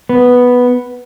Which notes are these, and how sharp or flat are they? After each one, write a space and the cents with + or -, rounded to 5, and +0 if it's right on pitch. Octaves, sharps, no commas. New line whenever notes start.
B3 +0 B4 +0